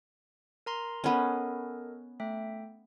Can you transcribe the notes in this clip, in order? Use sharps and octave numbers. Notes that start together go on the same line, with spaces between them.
A#4 A#5 C6
B3 C#4 A4 A#4 D#5
A3 E5 G5